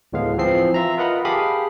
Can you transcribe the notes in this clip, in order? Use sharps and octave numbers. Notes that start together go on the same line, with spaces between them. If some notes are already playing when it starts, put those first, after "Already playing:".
D2 A2 G#3 B3 F5
E3 F3 C4 C7
F4 E5 A#5
F4 A#4 B4 D#5 F#5 B5
G4 G#4 F5 A5 B5 D#6